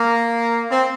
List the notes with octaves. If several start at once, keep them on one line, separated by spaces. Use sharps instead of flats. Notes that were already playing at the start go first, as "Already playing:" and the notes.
Already playing: A#3
C4